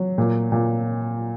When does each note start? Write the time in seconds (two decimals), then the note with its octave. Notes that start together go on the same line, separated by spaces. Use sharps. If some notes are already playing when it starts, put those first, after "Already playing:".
Already playing: F#3
0.18 A#2
0.52 A#2